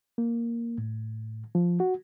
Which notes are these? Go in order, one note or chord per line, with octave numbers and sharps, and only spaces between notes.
A#3
A2
F3
F#4